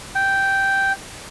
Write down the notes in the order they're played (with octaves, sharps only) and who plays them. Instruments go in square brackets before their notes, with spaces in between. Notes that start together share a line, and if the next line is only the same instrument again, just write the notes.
[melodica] G5